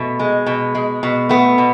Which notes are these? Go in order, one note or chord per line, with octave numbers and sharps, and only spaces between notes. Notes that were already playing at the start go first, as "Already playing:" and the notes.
Already playing: B2 A3
G#3
B2
G#3
B2
A3 B3
B2